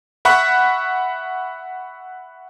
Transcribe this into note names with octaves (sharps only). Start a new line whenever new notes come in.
E5 F#5 B5 C#6 F#6